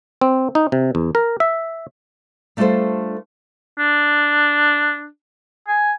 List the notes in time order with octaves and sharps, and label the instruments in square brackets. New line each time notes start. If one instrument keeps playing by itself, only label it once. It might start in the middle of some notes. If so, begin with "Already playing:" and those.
[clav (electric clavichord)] C4
D#4
C3
E2
A#4
E5
[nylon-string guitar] G3 A3 D4 F4 A4 C5
[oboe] D4
G#5